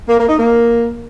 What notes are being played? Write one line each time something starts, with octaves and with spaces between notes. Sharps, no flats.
A#3
A#3
D#4
A#3